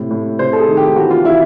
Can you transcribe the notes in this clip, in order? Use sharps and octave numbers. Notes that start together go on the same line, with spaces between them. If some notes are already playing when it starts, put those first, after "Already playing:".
Already playing: A2 C3
A2
C3 C5
A4
G#4
D#3
G4
E3 F#4
F4
E3 E4